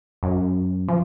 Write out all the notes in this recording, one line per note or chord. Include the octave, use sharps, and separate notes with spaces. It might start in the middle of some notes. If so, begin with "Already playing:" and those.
F#2
F3